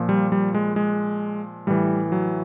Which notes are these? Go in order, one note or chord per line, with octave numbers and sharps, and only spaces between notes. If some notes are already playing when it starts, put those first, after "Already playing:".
Already playing: A#2 F3
G3
G3
G#3
G#3
A2 E3 G3
F#3